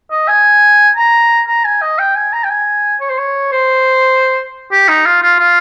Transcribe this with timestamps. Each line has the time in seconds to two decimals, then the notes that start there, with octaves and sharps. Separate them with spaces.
0.11 D#5
0.28 G#5
0.96 A#5
1.47 A#5
1.64 G#5
1.82 D#5
1.99 G5
2.16 G#5
2.33 A#5
2.44 G5
2.50 G#5
3.01 C#5
3.09 C5
3.18 C#5
3.52 C5
4.72 G4
4.88 D#4
5.06 F4
5.22 F4
5.39 F4